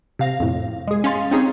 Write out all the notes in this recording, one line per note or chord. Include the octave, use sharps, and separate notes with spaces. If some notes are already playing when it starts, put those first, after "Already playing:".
C3 F5 A#6
F2 A2
G#3 G#4
C#4 F5 C6 A6
C4 C#4 D#4 G#4 C#5